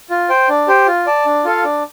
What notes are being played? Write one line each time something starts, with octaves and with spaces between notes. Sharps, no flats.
F4
C5 G5
D4
G4 C5 G5
F4
D5 A5
D4
F4 A4 F5
D4